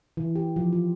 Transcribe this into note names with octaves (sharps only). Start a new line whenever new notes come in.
E3
G4
F3
F4